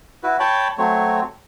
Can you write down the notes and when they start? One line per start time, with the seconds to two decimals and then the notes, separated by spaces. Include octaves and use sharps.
0.23 E4 F#4 B4
0.40 C#5 G5 A5 B5
0.78 F#3 A3 C4 C#5